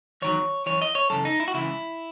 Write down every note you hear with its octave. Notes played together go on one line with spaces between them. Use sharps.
E2 D#3 F#3 C#5
F#2 E3 C#5
D#5
C#5
F#2 C#3 E3 A4
D#4
E4
F#4
C#2 C#3 E3 E4